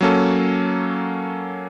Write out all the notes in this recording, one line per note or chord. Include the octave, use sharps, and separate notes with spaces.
F#3 A#3 C#4 A4